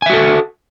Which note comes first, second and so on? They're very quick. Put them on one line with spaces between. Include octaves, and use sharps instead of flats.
G#5 E5 F#4 A4